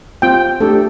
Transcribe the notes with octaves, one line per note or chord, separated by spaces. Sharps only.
C4 F4 G5
A3 D4 G4 A4